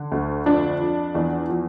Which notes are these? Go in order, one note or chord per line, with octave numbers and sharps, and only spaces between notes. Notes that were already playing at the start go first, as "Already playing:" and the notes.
Already playing: D3
D2
F2 D4
F3
E2
F3